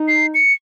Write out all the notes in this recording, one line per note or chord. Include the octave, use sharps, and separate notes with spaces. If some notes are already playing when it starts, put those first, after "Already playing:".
Already playing: D#4
C7
C#7